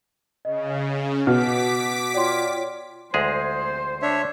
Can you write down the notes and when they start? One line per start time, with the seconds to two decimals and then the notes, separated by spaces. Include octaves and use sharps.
0.45 C#3 D#5
1.27 B2 D6 F6 B6
2.14 F4 C#5 D5 G5 C6
3.14 D2 G#3 G#4 C5
4.02 D4 C#5 E5